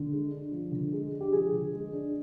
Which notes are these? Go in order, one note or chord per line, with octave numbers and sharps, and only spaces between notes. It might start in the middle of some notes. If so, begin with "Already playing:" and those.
Already playing: D3
G#3
D4
F3
D3
G#3
D4
G4
F3 G#4
D3
G#3
D4